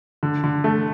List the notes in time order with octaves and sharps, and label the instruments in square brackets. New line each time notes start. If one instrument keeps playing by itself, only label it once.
[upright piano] D3
D3
A3